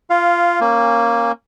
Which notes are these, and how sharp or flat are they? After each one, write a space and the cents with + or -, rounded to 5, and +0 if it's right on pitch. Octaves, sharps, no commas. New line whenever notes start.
F4 -15 F5 +0
A#3 +0 C#4 -20 G#5 -25